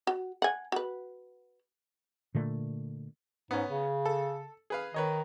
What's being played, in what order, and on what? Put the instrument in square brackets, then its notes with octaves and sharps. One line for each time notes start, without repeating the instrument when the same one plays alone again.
[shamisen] F#4
F#5 G#5
F#4 B4
[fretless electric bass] A#2 D3 A3
[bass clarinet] G#2 [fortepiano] B3 C#4
[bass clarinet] C#3
[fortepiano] A4
G#4 B4 F5
[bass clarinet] D#3 [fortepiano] B4 C#5 D#5